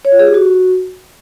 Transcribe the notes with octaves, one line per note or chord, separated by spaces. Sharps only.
C#5
F4
G#4
G4
F#4